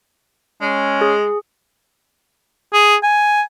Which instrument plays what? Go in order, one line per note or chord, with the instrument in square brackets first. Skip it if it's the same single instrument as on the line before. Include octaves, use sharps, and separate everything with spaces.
[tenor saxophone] G#3 [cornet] C#4
[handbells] G#4
[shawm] G#4
G#5